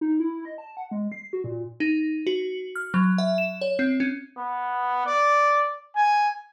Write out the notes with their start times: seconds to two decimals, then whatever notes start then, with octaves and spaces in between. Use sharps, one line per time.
0.01 D#4
0.20 E4
0.45 D#5
0.58 A5
0.77 F#5
0.91 G#3
1.12 C7
1.33 F#4
1.44 A#2
1.80 D#4
2.27 F#4
2.76 F6
2.94 F#3
3.18 E5
3.38 E7
3.61 C#5
3.79 C4
4.00 C#4
4.37 B3
5.06 D5
5.95 G#5